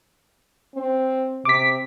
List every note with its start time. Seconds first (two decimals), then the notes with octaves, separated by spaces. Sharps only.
0.75 C4
1.45 C3 D6 B6